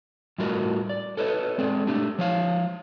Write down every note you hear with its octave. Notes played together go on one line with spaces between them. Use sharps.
A2 G3 F4 F#4 A#4 D#5
D5
A4 B4 C#5 D#5
G#3 C4 G#4 D5
A3 D4 G4 A4
F3 C#5 F5